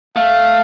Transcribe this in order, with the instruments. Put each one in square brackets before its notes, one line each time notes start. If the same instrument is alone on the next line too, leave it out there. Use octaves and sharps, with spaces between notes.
[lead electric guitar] A3 [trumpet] F5